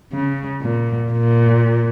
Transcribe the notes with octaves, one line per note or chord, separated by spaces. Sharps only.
C#3
A#2
A#2